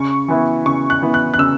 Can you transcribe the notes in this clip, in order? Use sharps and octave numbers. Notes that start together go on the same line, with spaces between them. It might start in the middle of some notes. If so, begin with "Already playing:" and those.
Already playing: C#3 C#6
E3 B3 E4
C#3 C#6
F#6
E3 B3 E4
F#6
F#6
C#3 E6